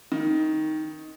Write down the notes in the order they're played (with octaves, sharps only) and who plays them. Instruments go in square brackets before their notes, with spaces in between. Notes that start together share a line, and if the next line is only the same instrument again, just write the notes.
[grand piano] D#3